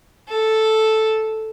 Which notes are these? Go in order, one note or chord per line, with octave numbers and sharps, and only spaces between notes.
A4